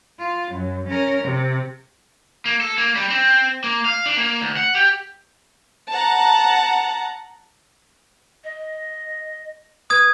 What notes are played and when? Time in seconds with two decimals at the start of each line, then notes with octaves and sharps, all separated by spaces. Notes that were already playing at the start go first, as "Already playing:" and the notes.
0.19 F4
0.52 F#2
0.88 C#4 A#4
1.24 C3
2.45 A#3
2.61 A4
2.78 A#3
2.95 G3
3.10 C4
3.64 A#3
3.85 F5
4.05 D4
4.17 A#3
4.41 D2
4.57 F#5
4.75 G4
5.92 F#5 A5 A#5
8.44 D#5
9.90 B4 D#6 G#6